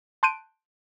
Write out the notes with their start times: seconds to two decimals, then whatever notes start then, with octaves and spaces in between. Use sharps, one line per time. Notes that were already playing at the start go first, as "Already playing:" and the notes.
0.23 A5 C6 F#6 G6 D7 D#7